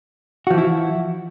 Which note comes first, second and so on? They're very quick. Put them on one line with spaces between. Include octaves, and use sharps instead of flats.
F#4 F3 E3 E4